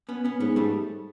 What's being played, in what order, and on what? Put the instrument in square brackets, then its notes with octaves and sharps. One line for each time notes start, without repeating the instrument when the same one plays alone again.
[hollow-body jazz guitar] B3 C#4
B3 C#4
[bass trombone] G#2 [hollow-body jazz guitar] B3 C#4
[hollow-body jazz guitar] G3 A3